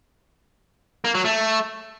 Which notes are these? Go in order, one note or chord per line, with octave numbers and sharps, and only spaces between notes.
A#3
F#3
A3